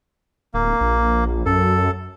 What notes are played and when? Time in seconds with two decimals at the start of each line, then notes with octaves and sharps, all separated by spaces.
0.54 D1 A#3
0.81 A#1
1.46 F#2 A4